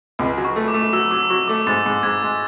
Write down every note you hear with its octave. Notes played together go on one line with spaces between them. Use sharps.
C#2
F#3
C#6
A3
D6
A3
F#3 E6
F#3 D6
F#3 C#6
A3 D6
G#2 A6
G#2
G#2 G#6
G#3